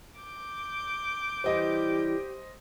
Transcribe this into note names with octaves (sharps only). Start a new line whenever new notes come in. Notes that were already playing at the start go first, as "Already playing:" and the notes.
D6 G6
E3 G3 G4 C5 D#5